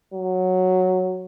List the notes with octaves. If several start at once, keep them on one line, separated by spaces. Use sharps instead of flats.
F#3